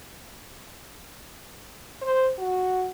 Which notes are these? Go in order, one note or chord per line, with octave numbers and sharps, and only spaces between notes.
C5
F#4